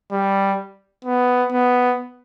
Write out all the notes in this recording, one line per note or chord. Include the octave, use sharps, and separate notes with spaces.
G3
B3
B3